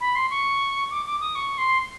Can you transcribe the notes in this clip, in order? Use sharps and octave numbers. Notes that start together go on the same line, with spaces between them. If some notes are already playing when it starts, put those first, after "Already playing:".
B5
C6
C#6
D6
D6
D#6
C#6
C6